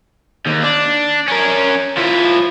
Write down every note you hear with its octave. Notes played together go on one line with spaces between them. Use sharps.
D#2
D4
C#4 A#4
F3 E4